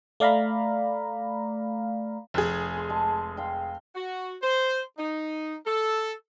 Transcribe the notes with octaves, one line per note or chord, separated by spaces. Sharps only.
A3 D5 F5 A#5 B5
F1 G#4
C6
G#3 A5
F5 G5
F#4
C5
D#4
A4